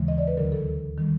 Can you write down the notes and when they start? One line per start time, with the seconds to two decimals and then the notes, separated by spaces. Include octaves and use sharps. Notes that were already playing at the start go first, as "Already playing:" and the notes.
Already playing: D#2 C#3 E3 G#3
0.08 D#5
0.18 D5
0.28 B4
0.37 D2 D3 F#3 A#4
0.52 A4
0.98 D#3 G3